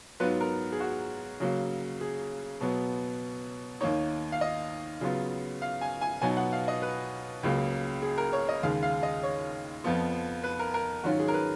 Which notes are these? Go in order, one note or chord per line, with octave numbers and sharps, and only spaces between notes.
G#2 F#3 B3 F4 B4
A#4
G#4
F#4
C#3 F#3 A#3
G#4
B2 F#3 B3
D#2 D#3 A#3 D#4 C#5
F5
D#5
C#3 F#3 B3 F4
F5
G#5
G#5
B2 F#3 B3 D#4 G#5
F#5
F5
D#5
B4
C#2 C#3 F#3 A#3
G#4
A#4
C#5
D#5
D#2 C#3 G#3 F5
F5
D#5
C#5
F2 F3 B3 F4
B4
A#4
A#4
G#2 D#3 F#3 C#4 F4 F#4
G#4
A#4
B4